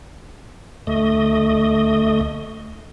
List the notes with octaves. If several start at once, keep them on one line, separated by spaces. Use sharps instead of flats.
D2 A3 D#5